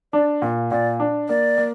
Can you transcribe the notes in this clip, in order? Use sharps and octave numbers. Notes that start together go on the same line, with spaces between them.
D4 D5
A#2 F5
A#2 D5
D4
A#3 D5
A#3